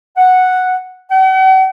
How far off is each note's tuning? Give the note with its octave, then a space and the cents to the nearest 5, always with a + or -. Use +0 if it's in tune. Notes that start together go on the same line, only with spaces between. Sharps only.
F#5 -5
F#5 +45